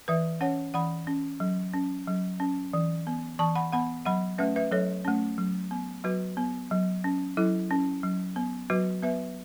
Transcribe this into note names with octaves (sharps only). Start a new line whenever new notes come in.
E3 B4 E5
C#4 C#5 F#5
E3 F#5 B5
C#4
F#3
C#4
F#3
C#4
E3
B3
E3 A5 C#6
F#5 B5
B3 F#5 B5
F#3 F#5 B5
A3 C#4 B4 E5
B4 E5
F#3 A4 C#5
A3 C#4
F#3
B3
F#3 F#4 B4
B3
F#3
C#4
F#3 E4 A4
C#4
F#3
B3
F#3 F#4 B4
B3 B4 E5